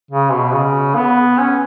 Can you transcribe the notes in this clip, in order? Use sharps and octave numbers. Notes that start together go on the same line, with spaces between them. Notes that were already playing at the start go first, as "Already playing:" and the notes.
C#3
B2
C#3
B3
C#4